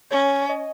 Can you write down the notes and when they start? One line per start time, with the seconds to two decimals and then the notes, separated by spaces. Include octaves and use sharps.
0.11 C#4 C#5
0.49 D#5